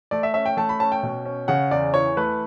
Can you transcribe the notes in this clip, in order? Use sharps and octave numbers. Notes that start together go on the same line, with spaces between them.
A3 D5
E5
C#4 E5
G5
A3 A5
B5
C#4 A5
G5
B2
C#4
C#3 F#5
E2 D5
E3 C#5
A3 B4